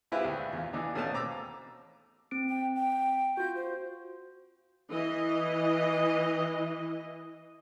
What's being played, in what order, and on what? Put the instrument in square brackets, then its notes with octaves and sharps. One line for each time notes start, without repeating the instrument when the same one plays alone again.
[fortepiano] G#3 C4 E4 F4 G4 B4
D2
E2 F4
E3 D4 D#4
E2 B2 A3 C#4 F5 A5
C4 A#5 D6 E6
[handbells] C4 D7
[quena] G5
G5
[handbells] F4 F#4 [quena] G6
[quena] C5
[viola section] E3 D#5